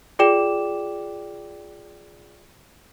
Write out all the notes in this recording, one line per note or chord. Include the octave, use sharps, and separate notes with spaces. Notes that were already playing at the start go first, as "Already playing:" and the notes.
F4 G#4 D5 G5 D6 E7